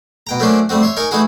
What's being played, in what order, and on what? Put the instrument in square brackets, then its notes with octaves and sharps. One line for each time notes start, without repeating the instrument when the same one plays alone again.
[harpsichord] B2 G5 A#5
F#3 A3 A#3 C#4 D4 C5
G3 A3 C4 F#4
C#5 E5 C6
D#4 A#4 G#5 C#6
E3 A3 D#4 E4 F#4 G#4